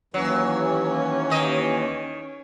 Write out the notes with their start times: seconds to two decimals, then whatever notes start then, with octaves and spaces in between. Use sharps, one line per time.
0.14 D#2 E3 F#3 C#4
1.30 D#3 D#5